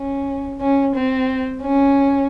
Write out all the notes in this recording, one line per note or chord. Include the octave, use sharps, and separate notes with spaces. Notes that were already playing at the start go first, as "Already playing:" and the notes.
Already playing: C#4
C#4
C4
C#4